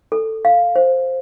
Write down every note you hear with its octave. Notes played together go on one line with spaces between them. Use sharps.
A4
F5
C5